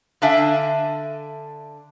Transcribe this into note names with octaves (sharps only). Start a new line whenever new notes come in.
D3 D4 E5 F5 G#5